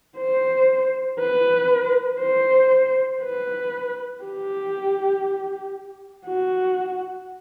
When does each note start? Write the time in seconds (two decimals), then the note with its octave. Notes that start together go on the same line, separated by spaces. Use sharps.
0.17 C5
1.19 B4
2.20 C5
3.22 B4
4.23 G4
6.26 F#4